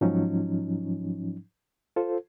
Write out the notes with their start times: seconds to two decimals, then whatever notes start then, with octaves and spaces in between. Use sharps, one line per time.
0.01 G#2 F3 F#3 C#4 D#4
1.96 F4 A4 C5